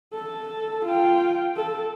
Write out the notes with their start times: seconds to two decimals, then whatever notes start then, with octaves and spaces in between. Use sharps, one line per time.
0.13 A4
0.85 F4 G5
1.56 A4